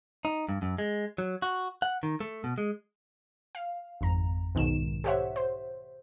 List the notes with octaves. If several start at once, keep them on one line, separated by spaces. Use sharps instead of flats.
D#4
G2
F#2
G#3
F#3
F#4
F#5
D#3
A3
B2
G#3
F5
G#1 F2 A#5
B1 G#2 B2 D#3 E7
G4 A4 C5 C#5 E5 F#5
C5